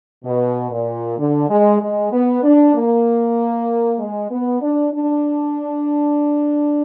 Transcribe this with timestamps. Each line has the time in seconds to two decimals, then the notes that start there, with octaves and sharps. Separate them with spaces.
0.24 B2
0.71 A#2
1.19 D3
1.49 G#3
1.81 G#3
2.12 B3
2.43 D4
2.74 A#3
3.99 G#3
4.31 B3
4.62 D4
4.93 D4